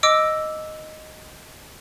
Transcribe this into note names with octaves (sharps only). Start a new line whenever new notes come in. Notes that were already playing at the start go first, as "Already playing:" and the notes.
D#5 D6 E6 D7